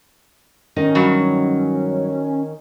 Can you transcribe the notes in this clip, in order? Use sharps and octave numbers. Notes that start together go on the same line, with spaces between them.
D#3 C#4 D#4 D#5
G2 F#3